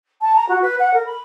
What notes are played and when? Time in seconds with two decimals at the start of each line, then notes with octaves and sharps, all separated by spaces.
0.21 A5
0.35 A#5
0.48 F#4
0.62 B4
0.79 F#5
0.93 A#4
1.05 B5